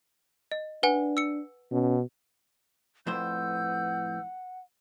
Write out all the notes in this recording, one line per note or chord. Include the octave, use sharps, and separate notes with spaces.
D#5
D4 B4 F#5 G#5
E6 C#7
B2 C#4
F2 A2 B4 C5 F#5 E6 G6